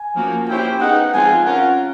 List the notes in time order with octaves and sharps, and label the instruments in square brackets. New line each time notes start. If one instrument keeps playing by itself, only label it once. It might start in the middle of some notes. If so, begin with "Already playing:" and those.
Already playing: [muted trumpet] G#5
[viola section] F3 A#3 C#4 F#4
[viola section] C#4 E4 G4 C5 [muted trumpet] G5
[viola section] B3 D#4 G#4 [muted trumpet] F#5
[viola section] F3 G#3 C4 F4 [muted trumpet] G#5
[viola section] C#4 F4 A#4 [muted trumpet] F#5